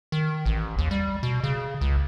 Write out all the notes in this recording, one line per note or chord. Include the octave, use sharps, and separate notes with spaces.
D#3
A1
D#2
G3
B2
C#3
C#2